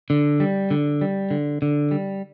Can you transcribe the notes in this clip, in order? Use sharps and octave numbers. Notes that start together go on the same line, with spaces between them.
D3
G3
D3
G3
D3
D3
G3